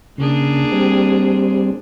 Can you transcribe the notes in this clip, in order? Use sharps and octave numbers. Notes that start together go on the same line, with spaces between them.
C#3 A#3 D4 G#4
G3 C4